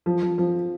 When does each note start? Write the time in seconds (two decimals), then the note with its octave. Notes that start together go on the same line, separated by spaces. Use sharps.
0.06 F3
0.22 F3
0.38 F3